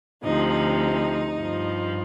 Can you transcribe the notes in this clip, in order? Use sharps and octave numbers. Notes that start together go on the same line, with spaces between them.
D2 C3 F3 D#4
D#4
G2 F3